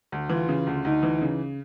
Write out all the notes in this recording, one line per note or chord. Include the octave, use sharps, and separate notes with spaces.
D2
E3 F4
C#3
D2
D2 D#4
E3
C#3